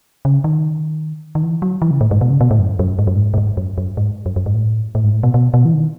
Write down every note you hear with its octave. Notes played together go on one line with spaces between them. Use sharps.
C#3
D#3
D#3
E3
F#3
E3
C#3
A2
G#2
B2
C#3
B2
A2
F#2
F#2
G#2
F#2
G#2
A2
G#2
F#2
F#2
G#2
F#2
F#2
G#2
A2
A2
G#2
A2
B2
B2
B2
E3
D#3